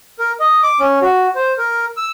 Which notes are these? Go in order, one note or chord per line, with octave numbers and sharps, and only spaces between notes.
A#4
D#5
D6
C#4
F#4
C5
A#4
E6